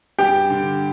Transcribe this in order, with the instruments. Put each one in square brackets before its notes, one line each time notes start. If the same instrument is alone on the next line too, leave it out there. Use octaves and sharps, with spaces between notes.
[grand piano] G2 G4 G5
D3